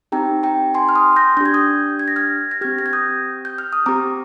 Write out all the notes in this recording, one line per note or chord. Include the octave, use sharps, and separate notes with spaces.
C4 D#4 G4 G5 A#5
G5 A#5
G#5 C6
F6
C6 D#6
G6 A#6
D4 G4 G6 G#6
D#6 G6
G#6
A#6
F6 G#6
A#6
C4 G4 F6 G#6
A#6
G#6
D#6 G6
G6
F6
D#6
C4 G4 A#5 D6